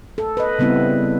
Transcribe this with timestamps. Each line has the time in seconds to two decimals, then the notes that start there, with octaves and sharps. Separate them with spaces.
0.18 A4
0.37 B4 D#5
0.59 C#3 G3 B3 C4 E4